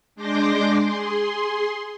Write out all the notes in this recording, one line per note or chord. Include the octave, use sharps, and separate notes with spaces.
G#3 D4 C6 D6 G6 A#6
G#4 C6